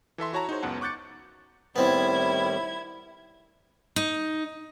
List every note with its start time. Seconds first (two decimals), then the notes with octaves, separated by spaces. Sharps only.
0.18 E3 A4 E5 C6
0.33 E4 F#4 C#5 A5 A#5
0.49 D#4 F#4 G#4 C5 C#5
0.62 C#2 F#2 B3 F#5 A5
0.81 C#6 D6 F#6 G6 A6 C#7
1.76 A2 D#3 G3 B3 C4 E4 G#6
3.96 D#4